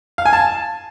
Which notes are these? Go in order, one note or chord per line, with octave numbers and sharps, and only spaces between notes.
F5
G#5
A5